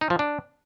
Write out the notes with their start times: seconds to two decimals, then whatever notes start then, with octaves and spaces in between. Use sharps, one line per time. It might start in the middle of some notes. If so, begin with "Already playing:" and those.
0.01 D#4
0.10 F3
0.19 D4